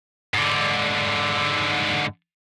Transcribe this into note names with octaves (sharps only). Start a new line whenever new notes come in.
G#2 D3